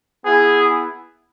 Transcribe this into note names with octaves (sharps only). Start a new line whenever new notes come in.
B3 E4 G#4